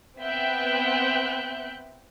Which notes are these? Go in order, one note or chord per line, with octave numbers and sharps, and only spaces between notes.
B3 C4 E5 G5 F#6 G6